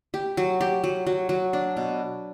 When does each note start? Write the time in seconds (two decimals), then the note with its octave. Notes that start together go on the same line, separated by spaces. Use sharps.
0.14 G4
0.37 F#3
0.61 G4
0.84 F#3
1.06 F#3
1.29 F#3
1.53 D4
1.77 B2